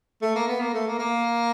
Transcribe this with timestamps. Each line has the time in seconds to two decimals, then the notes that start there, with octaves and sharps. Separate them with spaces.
0.22 A3
0.35 A#3
0.48 B3
0.60 A#3
0.74 A3
0.87 A#3
0.99 A#3